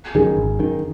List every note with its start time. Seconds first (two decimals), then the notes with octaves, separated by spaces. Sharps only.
0.15 F#2 D#3 G#4
0.37 G#1
0.59 F#2 D#3